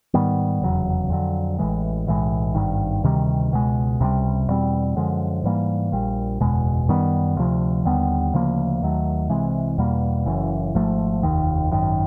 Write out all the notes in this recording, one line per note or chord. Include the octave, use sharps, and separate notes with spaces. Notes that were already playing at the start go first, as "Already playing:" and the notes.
G#2 D#3 G3 B3
F1 E2 C#3 F#3
F2 D3 F#3
A1 A2 E3 G#3
B1 A2 E3 G#3
G#1 G2 D#3
D2 C3 D#3 G3
C#2 B2 G#3
C#2 C3 E3 G3
E2 B2 G3 C4
F#2 D3 F3 G#3
G#2 E3 G3 A#3
A#1 A#2 G3
F#1 E2 B2 G#3
F#2 D#3 G3 B3
D2 C3 F3
D#2 D3 G3 B3
D2 C#3 F3 A#3
D#2 D#3 F#3 A3
C2 C3 E3 G#3
E2 B2 G3 A#3
F#1 F#2 C#3 E3
G#1 G#2 F3 A3
F1 D#2 D#3
G#1 F#2 D#3